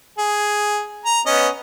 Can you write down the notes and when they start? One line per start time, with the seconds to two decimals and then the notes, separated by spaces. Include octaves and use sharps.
0.18 G#4
1.05 A#5
1.26 B3 C#4 D#5